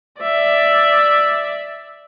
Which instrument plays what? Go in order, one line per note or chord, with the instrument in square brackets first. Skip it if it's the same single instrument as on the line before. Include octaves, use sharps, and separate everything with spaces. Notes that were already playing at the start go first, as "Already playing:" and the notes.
[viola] D5 E5